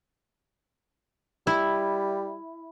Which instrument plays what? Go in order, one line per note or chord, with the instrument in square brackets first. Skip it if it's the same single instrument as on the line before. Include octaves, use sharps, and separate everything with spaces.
[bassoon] G3 [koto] E4